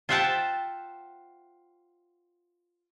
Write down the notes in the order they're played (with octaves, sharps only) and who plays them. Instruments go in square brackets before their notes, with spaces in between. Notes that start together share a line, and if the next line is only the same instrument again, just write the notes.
[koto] F4 C5 E5 F#5 G5 A5